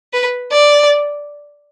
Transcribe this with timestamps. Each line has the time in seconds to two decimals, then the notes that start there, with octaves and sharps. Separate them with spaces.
0.13 B4
0.52 D5